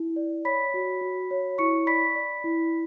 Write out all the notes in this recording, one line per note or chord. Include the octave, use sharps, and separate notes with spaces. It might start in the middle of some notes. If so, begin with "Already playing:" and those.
Already playing: E4
D5
C#5 B5 B6
F#4
F#4
C#5
E4 C#6 C#7
D5 B5 B6
D5
E4